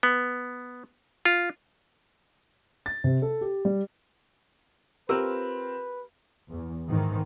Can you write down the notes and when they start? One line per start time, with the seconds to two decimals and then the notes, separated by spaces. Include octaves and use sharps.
0.03 B3
1.25 F4
2.86 A6
3.04 C3
3.22 A4
3.41 G4
3.65 G3
5.09 C4 F4 G4 A#4 B4 E6
6.49 E2
6.87 G#2 D#3 E3